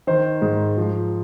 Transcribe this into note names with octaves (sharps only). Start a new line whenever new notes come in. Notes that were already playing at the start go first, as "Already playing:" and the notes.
D#3 C5
G#2
F3